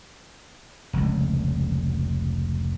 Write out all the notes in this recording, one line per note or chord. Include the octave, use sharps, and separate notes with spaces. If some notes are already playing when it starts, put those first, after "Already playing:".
F1 C#2